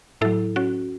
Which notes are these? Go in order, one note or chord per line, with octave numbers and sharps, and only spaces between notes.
A2 F#3 E4 A4
C#4 F#4